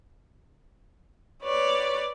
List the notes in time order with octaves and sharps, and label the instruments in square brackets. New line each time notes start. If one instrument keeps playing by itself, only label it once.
[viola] B4 D5 [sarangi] C#5